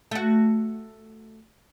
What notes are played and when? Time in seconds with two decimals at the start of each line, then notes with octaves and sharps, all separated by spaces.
0.11 A3 F#4